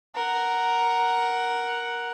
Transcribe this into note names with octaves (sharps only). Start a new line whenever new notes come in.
A#4 F#5